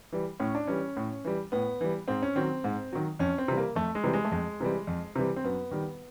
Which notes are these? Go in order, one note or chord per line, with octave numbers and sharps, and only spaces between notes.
E3 G3
A2 C#4
D4
E3 G3 C#4
A2
E3 G3
A2 B3
E3 G3
G#2 C4
C#4
D#3 F#3 C4
G#2
D#3 F#3
F2 C#4
C4
C3 E3 G3
A#3
F2 A3
G#3
C3 E3 G3
G#3
A3
F2 G#3
C3 E3 G3
F2
C3 E3 G3
C4
F#2 B3
D#3 G3